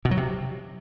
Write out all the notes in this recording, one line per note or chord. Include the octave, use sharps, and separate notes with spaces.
B2
F#3
C3